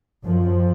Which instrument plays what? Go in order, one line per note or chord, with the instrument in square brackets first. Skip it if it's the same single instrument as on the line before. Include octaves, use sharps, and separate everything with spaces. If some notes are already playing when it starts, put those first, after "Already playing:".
[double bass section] F#2 F3